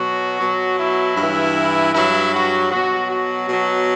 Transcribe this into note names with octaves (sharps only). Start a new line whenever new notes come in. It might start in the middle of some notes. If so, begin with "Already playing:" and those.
Already playing: B2 F#3 F#4
B2 F#3
E4
G2
E3
G2 F#3 E4
F#4
B2 F#3 F#4
F#4
B2 F#3